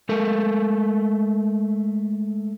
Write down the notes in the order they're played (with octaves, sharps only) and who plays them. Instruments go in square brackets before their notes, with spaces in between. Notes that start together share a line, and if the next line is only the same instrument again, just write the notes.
[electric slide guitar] G#3 A3 A4 A#4